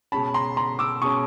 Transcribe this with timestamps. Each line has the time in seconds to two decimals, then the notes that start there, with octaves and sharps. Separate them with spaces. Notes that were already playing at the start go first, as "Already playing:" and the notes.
0.12 B2 G#3 C#4 A5 B5
0.34 A#5 C6
0.57 A#5 C6
0.79 D6 E6
1.02 B2 G#3 C#4 C#6 D#6